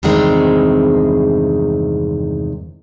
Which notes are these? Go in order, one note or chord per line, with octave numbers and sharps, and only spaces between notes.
E2 G2 C3 D#3 G#3 C4